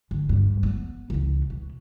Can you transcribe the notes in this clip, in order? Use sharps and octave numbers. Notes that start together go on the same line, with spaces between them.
D3
G2
B3
C#2 E3
B2